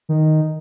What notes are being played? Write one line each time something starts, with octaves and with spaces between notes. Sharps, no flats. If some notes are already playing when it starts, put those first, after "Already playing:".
D#3